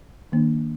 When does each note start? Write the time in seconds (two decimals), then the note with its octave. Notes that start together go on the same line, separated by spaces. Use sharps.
0.32 D#3 A#3 D4